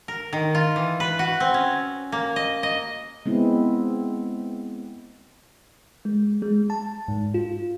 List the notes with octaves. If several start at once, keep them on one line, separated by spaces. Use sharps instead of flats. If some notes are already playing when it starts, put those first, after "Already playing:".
A#4
D#3
F4
E3
B4
F#4
C4
C#4
A#3
D#5
D#5
G#3 B3 C4 E4
G#3
G#3
A5
G#2
F4